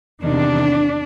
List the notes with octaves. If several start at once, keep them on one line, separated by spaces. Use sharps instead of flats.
E2 C3 D#3 D4